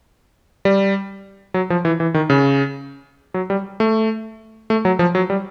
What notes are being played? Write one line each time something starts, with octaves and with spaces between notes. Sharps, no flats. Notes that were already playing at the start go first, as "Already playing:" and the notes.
G3
F#3
F3
E3
E3
D#3
C#3
F#3
G3
A3
A3
F#3
F3
F#3
G3